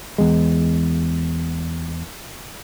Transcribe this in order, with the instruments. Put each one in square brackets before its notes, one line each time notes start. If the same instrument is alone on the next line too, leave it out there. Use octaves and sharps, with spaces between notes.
[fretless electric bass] E2 G#3